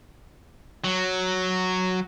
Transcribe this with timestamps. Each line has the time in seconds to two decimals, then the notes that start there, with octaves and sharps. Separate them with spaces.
0.84 F#3